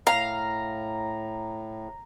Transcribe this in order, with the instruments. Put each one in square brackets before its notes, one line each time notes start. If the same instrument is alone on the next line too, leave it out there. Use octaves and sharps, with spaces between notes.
[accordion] A2 [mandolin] F5 [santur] A#5